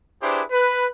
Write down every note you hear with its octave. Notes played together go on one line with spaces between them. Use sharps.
D4 E4 G4 G#4 B4 C5
B4